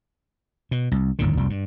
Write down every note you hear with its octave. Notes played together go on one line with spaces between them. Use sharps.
B2
C2
G1 D#2 A2 D3
F1 C2 F2 G3
G2